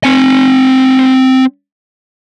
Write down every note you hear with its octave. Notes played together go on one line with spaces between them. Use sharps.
C4 G#5